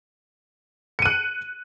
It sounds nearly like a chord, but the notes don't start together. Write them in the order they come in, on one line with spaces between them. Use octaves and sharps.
C#7 D#7 F#6